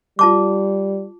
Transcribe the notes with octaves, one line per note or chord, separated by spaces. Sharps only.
G3 F4 A5 D6